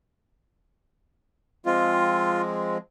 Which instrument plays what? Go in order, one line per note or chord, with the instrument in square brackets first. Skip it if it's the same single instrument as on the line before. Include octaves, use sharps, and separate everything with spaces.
[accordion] F3 G#3 C4 [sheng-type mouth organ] F4